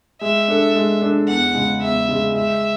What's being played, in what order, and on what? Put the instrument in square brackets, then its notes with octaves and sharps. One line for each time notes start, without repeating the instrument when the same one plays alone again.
[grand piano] G#3 [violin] E5
[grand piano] D4 A4
G#3
D4 A4
[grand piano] E2 [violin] F#5
[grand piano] C#3 G#3
[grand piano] E2 [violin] E5
[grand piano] C#3 G#3
[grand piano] G#3 [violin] E5